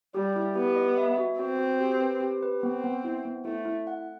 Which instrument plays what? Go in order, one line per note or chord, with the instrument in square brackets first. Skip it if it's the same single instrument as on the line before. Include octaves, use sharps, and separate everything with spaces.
[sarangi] G3 [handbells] G4
[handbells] E4
[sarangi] B3 [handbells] G4
[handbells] D#5
E5
F#4
[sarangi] C4 [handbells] F#4
[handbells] F#4
G4
B4
G4
B4
[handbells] B3 [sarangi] C4
[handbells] B3
E4
B3
[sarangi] A3 [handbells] E4
[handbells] E4
F#5